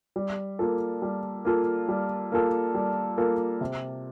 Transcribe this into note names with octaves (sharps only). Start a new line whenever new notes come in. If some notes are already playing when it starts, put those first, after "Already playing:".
G3
A#3 F4 A4
G3
A#3 F4 A4
G3
A#3 F4 A4
G3
A#3 F4 A4
C3